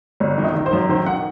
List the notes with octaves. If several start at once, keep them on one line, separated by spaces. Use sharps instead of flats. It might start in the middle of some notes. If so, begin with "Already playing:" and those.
G1
D#3
D#4
D#3
C5
F#2
D#3 C5
D#3 F#5